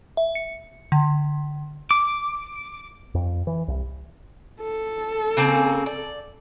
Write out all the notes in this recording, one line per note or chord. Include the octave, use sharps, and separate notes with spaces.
E5
C#7
D3
D6
F2
E3
C2
A4
C#3 A#3 C4
D5